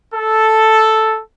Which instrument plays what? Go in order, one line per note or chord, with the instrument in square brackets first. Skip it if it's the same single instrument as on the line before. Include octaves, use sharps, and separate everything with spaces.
[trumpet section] A4